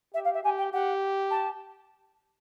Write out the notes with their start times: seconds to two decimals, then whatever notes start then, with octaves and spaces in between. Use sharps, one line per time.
0.14 G4 E5
0.24 F5
0.34 E5
0.43 G4 G#5
0.58 G5
0.72 G4 F#5
1.31 A5